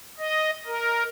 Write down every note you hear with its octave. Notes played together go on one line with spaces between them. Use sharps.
D#5
A#4